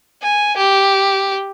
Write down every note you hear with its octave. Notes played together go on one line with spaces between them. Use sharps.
G#5
G4